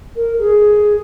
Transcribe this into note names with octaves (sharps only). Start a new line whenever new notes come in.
A#4
G#4